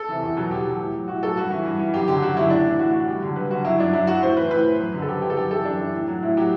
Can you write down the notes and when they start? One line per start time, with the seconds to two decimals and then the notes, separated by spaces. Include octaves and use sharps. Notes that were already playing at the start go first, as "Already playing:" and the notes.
Already playing: A4
0.09 C3 E3
0.22 E2
0.37 B2 F#3
0.51 E2 G4
0.65 B2 F#3
0.79 A2
0.94 F#3
1.08 A2 F#4
1.23 F#3 A4
1.37 G2 F#4
1.51 E3
1.65 G2
1.79 E3
1.94 F#2 G4
2.08 D3 F#3 G4
2.22 F#2 F#4
2.37 D3 F#3 E4
2.50 A2 D4
2.65 E3 E4
2.79 A2 F#4
2.93 E3 F#4
3.07 G2 G4
3.22 D3 F#3
3.36 G2 B4
3.50 D3 F#3 F#4
3.64 F#2 E4
3.79 F#3 D4
3.93 F#2 E4
4.07 F#3 F#4
4.22 A2 C5
4.37 E3 B4
4.51 A2 B4
4.64 E3
4.79 F#2
4.94 D3 F#3
5.02 A4
5.08 F#2 G4
5.22 D3 F#3 G4
5.30 A4
5.36 F#2 G4
5.51 E3 A4
5.64 F#2 D4
5.79 E3
5.94 A2
6.08 F#3
6.23 A2 E4
6.37 F#3 G4